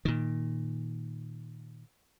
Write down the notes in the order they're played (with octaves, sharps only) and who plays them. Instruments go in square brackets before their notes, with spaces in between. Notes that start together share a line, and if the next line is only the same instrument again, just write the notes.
[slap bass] A#2 D#3